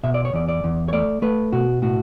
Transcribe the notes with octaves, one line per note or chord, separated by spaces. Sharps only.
B2 E5
D5
C#5
E2 D5
D5
E2
C#5
A3 D5
A3 B4
B2 F#4
A2 F#4